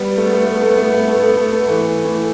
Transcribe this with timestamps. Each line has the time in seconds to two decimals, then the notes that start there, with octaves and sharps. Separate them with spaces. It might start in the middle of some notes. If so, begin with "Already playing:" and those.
Already playing: G3 B3
0.17 A3
0.25 B3
0.32 A3
0.39 B3
0.46 A3
0.54 B3
0.62 A3
0.69 B3
0.77 A3
0.85 B3
0.92 A3
1.00 B3
1.08 A3
1.14 B3
1.23 A3
1.30 B3
1.37 A3
1.45 B3
1.53 A3
1.60 B3
1.68 E3 A3
2.04 E3 A3